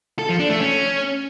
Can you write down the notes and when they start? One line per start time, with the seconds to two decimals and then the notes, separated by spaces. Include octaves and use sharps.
0.19 A4
0.29 F3
0.39 D4
0.50 A3
0.60 C#4